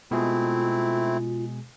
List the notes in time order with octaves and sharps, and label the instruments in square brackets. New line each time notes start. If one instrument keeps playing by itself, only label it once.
[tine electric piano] B2 G#3 G#4 [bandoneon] A3 C4 E4 [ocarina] F4